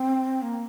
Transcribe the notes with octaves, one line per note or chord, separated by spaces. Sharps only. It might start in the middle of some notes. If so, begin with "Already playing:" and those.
Already playing: C4
A#3